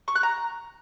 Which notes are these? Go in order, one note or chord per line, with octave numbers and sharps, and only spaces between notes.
C#6
F#6
A#5